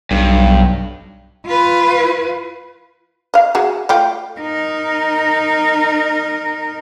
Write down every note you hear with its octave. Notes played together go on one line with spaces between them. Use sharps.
B1 G2
F4 B4
D#5 F5
F#4 G#4
A3 F4 G5
D#4 A#4